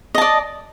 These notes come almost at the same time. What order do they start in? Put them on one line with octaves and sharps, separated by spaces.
D#5 A5 D5